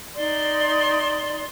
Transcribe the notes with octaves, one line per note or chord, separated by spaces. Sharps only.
D#4 D5 C6